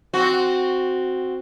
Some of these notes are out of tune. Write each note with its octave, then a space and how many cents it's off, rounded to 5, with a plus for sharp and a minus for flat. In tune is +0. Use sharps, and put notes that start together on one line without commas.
C4 +0 F#4 +0